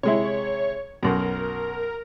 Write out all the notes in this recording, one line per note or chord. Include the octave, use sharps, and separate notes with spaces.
C3 G#3 E4 C#5
B1 F#2 A#4